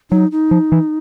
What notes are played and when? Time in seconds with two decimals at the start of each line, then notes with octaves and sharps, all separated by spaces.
0.11 F#3 D#4
0.31 D#4
0.51 F3
0.72 E3